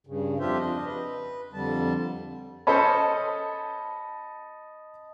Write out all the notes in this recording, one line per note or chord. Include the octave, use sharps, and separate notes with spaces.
G2 C#3
F2 D4 F4 G4 C5 E5
D4 D#5
B4
F2 D3 G3 A5
C#4 A4 C5 D#5 A5 B5